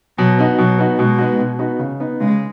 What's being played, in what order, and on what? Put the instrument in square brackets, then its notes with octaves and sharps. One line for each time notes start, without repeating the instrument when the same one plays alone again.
[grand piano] B2 [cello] F#3
[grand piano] B3 D#4 F#4
[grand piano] B2 [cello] F#3
[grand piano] B3 D#4 F#4
[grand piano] B2 [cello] G#3
[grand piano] B3 D#4 F#4
B2
B3 D#4 F#4
C#3
B3 D#4
[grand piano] C#3 [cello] G#3